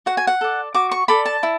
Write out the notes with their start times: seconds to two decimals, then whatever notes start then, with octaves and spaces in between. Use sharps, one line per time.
0.06 F#4 F#5
0.17 G#5
0.27 F#5
0.41 A4 D5
0.74 F#4 D6
0.91 C#6
1.08 A4 D5 B5
1.25 A5
1.43 E4